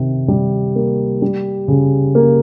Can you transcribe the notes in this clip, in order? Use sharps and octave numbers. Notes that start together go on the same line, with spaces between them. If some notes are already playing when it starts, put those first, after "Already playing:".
Already playing: C3 D#3
G3
A#3
G3
C#3
A#3